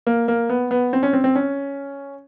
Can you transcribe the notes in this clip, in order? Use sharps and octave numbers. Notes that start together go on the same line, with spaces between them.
A#3
A#3
B3
B3
C4
C#4
C4
C4
C#4